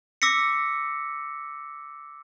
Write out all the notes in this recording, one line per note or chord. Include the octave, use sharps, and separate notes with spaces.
D6 E6 A#6 B6 C#7